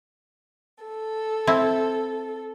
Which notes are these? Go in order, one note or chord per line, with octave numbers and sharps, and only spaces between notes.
A4
C4 E4